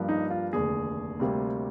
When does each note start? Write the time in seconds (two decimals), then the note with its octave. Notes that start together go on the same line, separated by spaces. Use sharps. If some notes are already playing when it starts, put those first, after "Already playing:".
Already playing: G2 F3 A#3
0.09 D#4
0.30 F4
0.53 F1 D#2 D3 G#4
1.19 D2 C3 G3 A#3